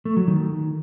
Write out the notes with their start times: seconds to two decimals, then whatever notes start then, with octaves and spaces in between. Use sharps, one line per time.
0.05 A3
0.17 F#3
0.28 D#3